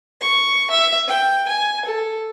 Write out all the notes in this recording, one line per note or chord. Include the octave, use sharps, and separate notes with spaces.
C#6
E5
G5
G#5
A4